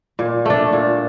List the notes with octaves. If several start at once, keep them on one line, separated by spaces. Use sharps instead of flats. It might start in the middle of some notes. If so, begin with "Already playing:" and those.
A#2
A3 D4
A#2